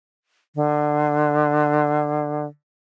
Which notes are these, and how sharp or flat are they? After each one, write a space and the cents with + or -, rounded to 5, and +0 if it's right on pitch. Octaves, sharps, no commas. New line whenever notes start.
D3 +20